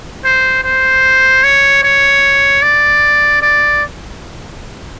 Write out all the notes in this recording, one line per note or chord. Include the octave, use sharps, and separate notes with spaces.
C5
C5
C#5
C#5
D5
D5